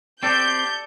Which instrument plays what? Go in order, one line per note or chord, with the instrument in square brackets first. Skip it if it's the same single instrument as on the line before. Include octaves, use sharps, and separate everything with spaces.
[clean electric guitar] C4 [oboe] G4 [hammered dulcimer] A4 D5 [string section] G6